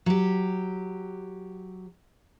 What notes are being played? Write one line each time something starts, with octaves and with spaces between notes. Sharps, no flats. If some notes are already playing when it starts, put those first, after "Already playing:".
F#3 G4